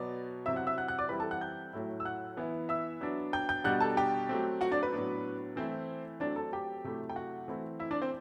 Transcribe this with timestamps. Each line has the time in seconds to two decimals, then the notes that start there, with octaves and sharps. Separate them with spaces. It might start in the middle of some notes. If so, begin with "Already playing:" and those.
Already playing: B2 F#3 B3 D5
0.45 C3 F#3 C4 E4 E5 E6
0.56 F#5 F#6
0.67 E5 E6
0.78 F#5 F#6
0.88 F#5 F#6
0.99 D5 D6
1.09 E3 G3 C4 E4 B4 B5
1.20 A4 A5
1.31 F#5 F#6
1.41 G5 G6
1.73 A2 F#3 A3 E4
2.00 E6
2.05 F#5 F#6
2.37 E3 B3 E4
2.69 E5 E6
3.01 F#3 B3 D4
3.33 G5 G6
3.49 G5 G6
3.64 B2 G3 D4 F#5 F#6
3.80 A4 A5
3.97 G4 G5
4.29 F#3 A3 C4
4.61 F#4 F#5
4.71 D4 D5
4.83 B4
4.93 A2 F#3 B3 D4
5.56 E3 A3 C4 E4 C5
6.20 F#3 A3 C4 D4 D5
6.36 A4 A5
6.53 G4 G5
6.84 C3 F#3 A3 E4
7.09 G5
7.16 F#4 F#5
7.48 E3 A3 C4 E4
7.80 E4 E5
7.91 D4 D5
8.02 C4 C5